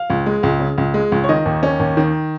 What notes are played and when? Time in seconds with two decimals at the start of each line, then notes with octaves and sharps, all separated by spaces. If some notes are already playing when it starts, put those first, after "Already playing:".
Already playing: F5
0.10 C#2
0.26 G#3
0.43 C#2
0.60 C#3
0.78 C#2
0.94 G#3
1.12 C#2
1.24 C#5
1.29 D#3 D#5
1.45 D#2
1.63 C#4
1.79 D#2
1.97 D#3